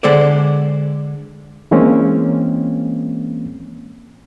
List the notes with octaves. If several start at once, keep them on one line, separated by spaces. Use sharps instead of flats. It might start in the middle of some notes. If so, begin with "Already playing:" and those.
D3 G#3 A4 C5 D5
E3 G#3 A#3 C4 C#4